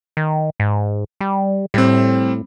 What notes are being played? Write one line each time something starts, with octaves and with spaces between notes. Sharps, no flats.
D#3
G#2
G3
A2 G3 C4